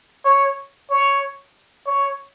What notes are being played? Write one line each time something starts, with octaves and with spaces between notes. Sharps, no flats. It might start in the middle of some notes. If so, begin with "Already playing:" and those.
C#5
C#5
C#5